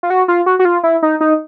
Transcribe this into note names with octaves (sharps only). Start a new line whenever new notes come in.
F4
F#4
F4
F#4
F#4
F4
E4
D#4
D#4